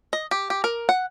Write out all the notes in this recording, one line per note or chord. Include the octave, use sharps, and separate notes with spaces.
D#5
G4
G4
A#4
F#5